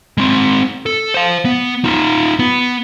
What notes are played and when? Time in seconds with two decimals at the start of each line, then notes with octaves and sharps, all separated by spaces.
0.18 G#3 C4
0.86 A4
1.14 C5 F5
1.45 B3
1.85 D#4 F4
2.39 B3